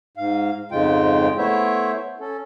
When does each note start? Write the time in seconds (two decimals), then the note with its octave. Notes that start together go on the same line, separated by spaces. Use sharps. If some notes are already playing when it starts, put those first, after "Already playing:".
0.17 G#2 F5
0.72 F2 G#2 C#3 G#3 F4 G5
1.38 A3 B3 E4 C5 C#5 E5
2.20 C#4 A4